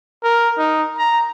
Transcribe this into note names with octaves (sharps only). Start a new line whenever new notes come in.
A#4
D#4
A#5